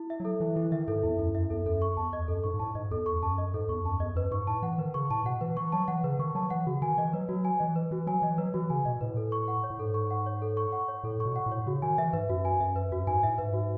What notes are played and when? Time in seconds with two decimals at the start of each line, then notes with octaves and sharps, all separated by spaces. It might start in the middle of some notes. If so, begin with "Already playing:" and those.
Already playing: E4
0.10 E5
0.20 F#3 A4
0.40 E3 E4
0.56 E3 E4
0.72 D#3 E5
0.88 G#2 A4
1.03 E2 E4
1.19 F#2 E4
1.35 F#2 E5
1.50 E2 A4
1.66 F#2 A4
1.82 C#6
1.97 E2 A5
2.13 D#5
2.28 F#2 A4
2.44 G#2 C#6
2.54 G#2
2.59 A2 A5
2.75 G#2 D#5
2.91 E2 A4
3.06 C#6
3.23 F#2 A5
3.38 D#5
3.54 G#2 A4
3.69 E2 C#6
3.85 F#2 A5
4.00 E2 D#5
4.16 F#2 B4
4.31 G#2 C#6
4.47 A2 A5
4.62 E3 F#5
4.78 D#3 B4
4.94 C#3 C#6
5.10 A2 A5
5.25 B2 F#5
5.41 E3 B4
5.57 E3 C#6
5.72 F#3 A5
5.88 E3 F#5
6.04 C#3 B4
6.19 D#3 C#6
6.35 F#3 A5
6.50 E3 F#5
6.67 C#3 F#4
6.82 D#3 G#5
6.98 E3 D#5
7.13 F#3 B4
7.29 F#3 F#4
7.45 G#5
7.60 E3 D#5
7.76 B4
7.91 E3 F#4
8.07 F#3 G#5
8.22 E3 D#5
8.38 F#3 B4
8.54 E3 F#4
8.70 C#3 G#5
8.85 B2 D#5
9.01 A2 B4
9.17 A4
9.32 C#6
9.48 F#5
9.64 C#5
9.70 A2
9.79 G#2 A4
9.94 C#6
10.11 F#5
10.26 C#5
10.42 A4
10.57 C#6
10.72 F#5
10.88 C#5
11.04 A2 A4
11.20 C#6
11.25 B2
11.36 F#5
11.46 A2
11.52 C#5
11.67 C#3 F#4
11.82 D#3 G#5
11.98 E3 E5
12.13 G#2 B4
12.29 F#2 F#4
12.45 G#5
12.60 F#2 E5
12.76 B4
12.92 F#2 F#4
13.07 G#2 G#5
13.23 A2 E5
13.38 G#2 B4
13.54 F#4